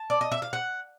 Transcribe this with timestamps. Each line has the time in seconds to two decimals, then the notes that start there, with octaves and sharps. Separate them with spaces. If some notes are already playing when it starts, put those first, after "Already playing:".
Already playing: A5
0.10 D5
0.21 D#5
0.32 E5
0.42 F5
0.53 F#5